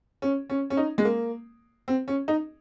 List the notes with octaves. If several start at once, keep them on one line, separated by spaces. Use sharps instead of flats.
C#4
C#4
C#4
D#4
G#3
A#3
C4
C#4
D#4